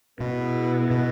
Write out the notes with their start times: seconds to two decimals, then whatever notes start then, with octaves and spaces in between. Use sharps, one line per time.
0.20 B2 B3 E4 G#4
0.90 B2